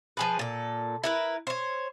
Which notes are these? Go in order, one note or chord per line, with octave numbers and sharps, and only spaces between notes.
F3 G#4 B4
A#2 A4
E4 A#4 B4
C5 C#5